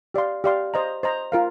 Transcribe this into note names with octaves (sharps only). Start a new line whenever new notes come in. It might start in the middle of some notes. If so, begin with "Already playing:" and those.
G4 D5 F5 C6
G4 D5 F5 C6
C5 D#5 A#5
C5 D#5 A#5
F4 A#4 F5